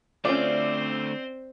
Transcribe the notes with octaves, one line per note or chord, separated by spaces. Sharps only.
D3 A3 C4 C#4 F4 C5 D5